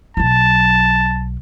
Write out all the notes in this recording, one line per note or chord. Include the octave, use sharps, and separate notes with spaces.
B1 F#3 A5